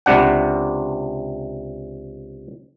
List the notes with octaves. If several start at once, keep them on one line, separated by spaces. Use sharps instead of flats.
C#2 C3 D4 F#5